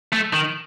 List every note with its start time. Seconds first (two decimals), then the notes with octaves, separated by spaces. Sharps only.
0.13 A3
0.34 D#3